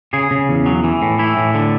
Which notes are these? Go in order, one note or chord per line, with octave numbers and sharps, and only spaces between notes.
C#3 G#4
C#3
E2
F#3
E3
A2
E3 E4
A2
D3